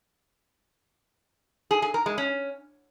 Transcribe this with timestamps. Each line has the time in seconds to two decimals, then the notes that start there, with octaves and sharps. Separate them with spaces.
1.71 G#4
1.82 G#4
1.94 A#4
2.06 G#3
2.18 C#4